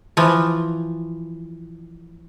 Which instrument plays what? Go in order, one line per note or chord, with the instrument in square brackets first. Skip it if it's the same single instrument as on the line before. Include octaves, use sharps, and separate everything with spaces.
[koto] E3 F3